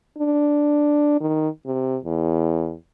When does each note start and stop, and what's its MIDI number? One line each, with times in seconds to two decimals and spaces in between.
0.18 1.19 62
1.21 1.48 51
1.66 1.97 48
2.04 2.76 40